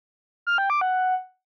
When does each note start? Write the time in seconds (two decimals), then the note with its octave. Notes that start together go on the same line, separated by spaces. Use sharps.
0.47 F6
0.58 G5
0.70 D6
0.81 F#5